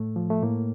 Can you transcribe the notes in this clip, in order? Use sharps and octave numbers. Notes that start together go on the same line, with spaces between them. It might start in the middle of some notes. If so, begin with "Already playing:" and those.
Already playing: A2 A3
F3
A3
A2 A#3